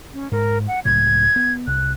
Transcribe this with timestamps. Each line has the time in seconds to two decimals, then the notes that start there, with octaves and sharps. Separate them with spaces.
0.14 C#4
0.32 G#2 A#4
0.68 F#5
0.85 C#2 A2 F#3 G#6
1.36 B3
1.67 C2 F#6